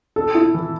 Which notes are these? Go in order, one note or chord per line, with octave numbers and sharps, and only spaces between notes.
A4
E4
E3